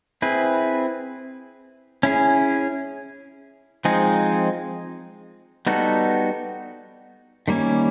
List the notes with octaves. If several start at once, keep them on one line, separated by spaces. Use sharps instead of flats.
C4 E4 G#4 B4
C#4 E4 G#4
F3 G#3 C4 D#4 G#4
G3 B3 D#4 F#4 A4
D#3 G3 A#3 C#4